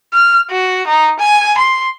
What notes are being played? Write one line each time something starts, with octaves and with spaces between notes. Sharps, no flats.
F6
F#4
D#4
G#5
C6